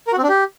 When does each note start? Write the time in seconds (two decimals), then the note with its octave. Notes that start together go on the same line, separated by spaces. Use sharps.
0.07 A#4
0.13 F#4
0.18 C4
0.23 D4
0.29 G4